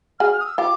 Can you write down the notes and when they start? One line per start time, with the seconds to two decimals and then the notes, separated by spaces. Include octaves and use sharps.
0.19 F#4 G#4 F6
0.32 F6
0.40 D#6
0.46 E6
0.58 F4 G4 D6